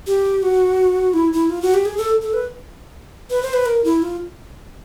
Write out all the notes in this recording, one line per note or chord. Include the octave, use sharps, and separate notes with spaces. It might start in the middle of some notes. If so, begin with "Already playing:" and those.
G4
F#4
E4
E4
F4
F#4
G4
G#4
A4
A4
B4
B4
C5
B4
A#4
E4
F4